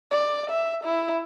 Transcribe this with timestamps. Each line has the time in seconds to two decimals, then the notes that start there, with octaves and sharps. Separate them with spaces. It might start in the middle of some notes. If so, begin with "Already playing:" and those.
0.11 D5
0.50 E5
0.84 E4